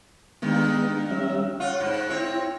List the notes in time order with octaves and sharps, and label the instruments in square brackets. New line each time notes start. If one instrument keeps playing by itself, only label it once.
[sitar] G2 D#3 [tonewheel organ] G#3 B3
[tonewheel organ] G3 C#4 E5
[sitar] F4 [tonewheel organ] C#5 F#5
[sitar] G#2
[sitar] C4 C#5 [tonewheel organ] E4